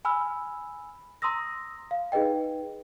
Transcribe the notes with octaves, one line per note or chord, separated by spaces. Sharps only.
G#5 B5 E6 F6
A#5 C6 D#6 E6 A#6
F5
D#4 G#4 B4 D#5 G5